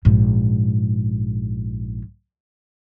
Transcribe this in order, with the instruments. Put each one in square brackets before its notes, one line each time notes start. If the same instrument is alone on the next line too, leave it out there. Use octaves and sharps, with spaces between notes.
[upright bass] A#1 G#2